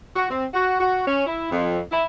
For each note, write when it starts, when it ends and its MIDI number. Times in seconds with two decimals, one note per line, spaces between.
0.16 0.28 66
0.30 0.45 60
0.54 0.79 66
0.80 1.04 66
1.07 1.24 61
1.27 1.48 64
1.51 1.81 41
1.91 2.04 64